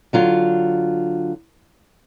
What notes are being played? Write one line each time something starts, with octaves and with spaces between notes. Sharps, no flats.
D3 F#3 F4